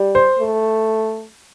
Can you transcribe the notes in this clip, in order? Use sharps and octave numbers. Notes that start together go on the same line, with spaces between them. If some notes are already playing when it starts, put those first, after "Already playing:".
Already playing: G3
C5
A3